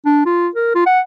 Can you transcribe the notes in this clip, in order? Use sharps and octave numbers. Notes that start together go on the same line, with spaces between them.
D4
F4
A#4
F4
F#5